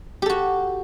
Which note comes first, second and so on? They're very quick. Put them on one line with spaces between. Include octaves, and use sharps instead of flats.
G4 A4 F#4